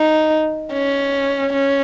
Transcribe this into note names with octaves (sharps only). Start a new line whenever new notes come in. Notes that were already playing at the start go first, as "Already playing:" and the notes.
Already playing: D#4
C#4
C#4